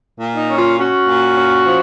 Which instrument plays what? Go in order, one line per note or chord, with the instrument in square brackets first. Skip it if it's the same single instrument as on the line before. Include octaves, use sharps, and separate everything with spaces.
[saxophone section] A#2
D#4
C#4
F4
C#4 F#4
A#2
C#4
F3